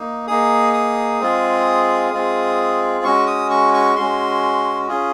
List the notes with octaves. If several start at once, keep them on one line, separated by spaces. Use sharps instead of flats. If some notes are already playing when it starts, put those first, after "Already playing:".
Already playing: A#3 D#4
A#3 D#4 G#4 D#6
D#6
G#3 C4 F4 G#4
G#3 C4 F4 G#4
G#3 C#4 F#4 C#6
D#6
C#6
C#6
G#3 C#4 F#4 C6
C#4 F4 G#4